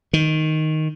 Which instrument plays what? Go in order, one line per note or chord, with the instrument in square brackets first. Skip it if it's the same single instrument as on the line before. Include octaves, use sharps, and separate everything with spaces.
[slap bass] D#3